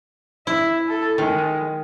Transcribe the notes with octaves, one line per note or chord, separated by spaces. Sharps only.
E4 E5
A4
D#3 G#3